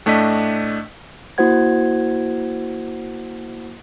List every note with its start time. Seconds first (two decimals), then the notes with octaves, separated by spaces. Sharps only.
0.06 A2 A3 D4 D#5 B6
1.38 A#3 E4 F#4 C5 F#5 G#6